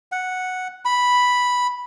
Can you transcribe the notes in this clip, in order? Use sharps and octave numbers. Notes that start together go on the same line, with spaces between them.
F#5
B5